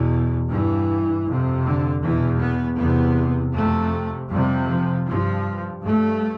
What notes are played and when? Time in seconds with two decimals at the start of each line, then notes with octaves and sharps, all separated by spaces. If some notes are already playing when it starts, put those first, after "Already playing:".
Already playing: E2 B2
0.50 G2 E3
1.26 F2 C3
1.64 D3
2.03 E2 B2 E3
2.41 B3
2.79 E2 C3 B3
3.55 F2 C3 A3
4.31 F2 C3 G3
4.69 F3
5.08 G2 F3
5.84 G2 A3